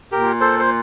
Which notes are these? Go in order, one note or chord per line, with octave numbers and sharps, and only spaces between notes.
A#2 G4 A#4
A4 C5
C5